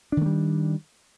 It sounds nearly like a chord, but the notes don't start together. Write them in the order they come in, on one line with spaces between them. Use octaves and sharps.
D4 D#3 A3 G3